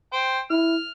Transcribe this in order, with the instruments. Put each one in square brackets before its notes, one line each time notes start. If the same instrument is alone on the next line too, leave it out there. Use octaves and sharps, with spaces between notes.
[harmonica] C5 G5
[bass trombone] E4 [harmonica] F6